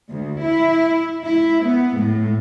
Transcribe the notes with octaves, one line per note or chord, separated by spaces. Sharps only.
D2
E4
E4
B3
A2